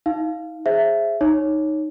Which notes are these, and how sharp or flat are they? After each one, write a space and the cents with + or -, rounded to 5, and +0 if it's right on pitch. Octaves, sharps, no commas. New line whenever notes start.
D#4 +35 F5 +0
G#4 +0 C5 +5 E5 +15
D#4 +0 C#5 +0